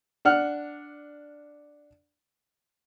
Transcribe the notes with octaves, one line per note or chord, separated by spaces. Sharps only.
D4 F#5 F6